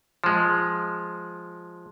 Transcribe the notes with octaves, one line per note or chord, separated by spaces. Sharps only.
F3 G#3